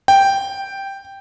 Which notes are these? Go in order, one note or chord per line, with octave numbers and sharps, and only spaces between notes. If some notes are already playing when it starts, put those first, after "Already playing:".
G5